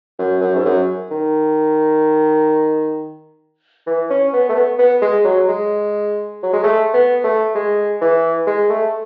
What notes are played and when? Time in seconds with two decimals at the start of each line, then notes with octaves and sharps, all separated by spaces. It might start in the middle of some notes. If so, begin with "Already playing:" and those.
0.19 F#2
0.41 F#2
0.55 G#2
0.65 F#2
1.10 D#3
3.87 E3
4.10 C#4
4.33 B3
4.49 A3
4.56 B3
4.79 B3
5.02 G#3
5.24 F#3
5.48 G#3
6.43 F#3
6.53 G#3
6.63 A3
6.93 B3
7.24 A3
7.55 G#3
8.01 E3
8.46 G#3
8.70 A3